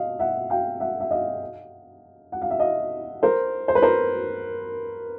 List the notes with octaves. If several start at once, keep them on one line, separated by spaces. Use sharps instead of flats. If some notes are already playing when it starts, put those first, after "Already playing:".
Already playing: D#5 F5
E5 F#5
F5 G5
E5 F#5
E5
D#5 F5
F#5
F5
E5
D#5 F5
A#4 C5
C5
B4
A#4 C5